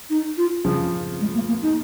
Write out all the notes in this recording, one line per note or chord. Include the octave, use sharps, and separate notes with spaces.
D#4
F4
C#3 F3
G#3
A#3
A#3
D#4